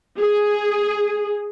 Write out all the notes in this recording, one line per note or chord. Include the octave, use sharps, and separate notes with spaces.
G#4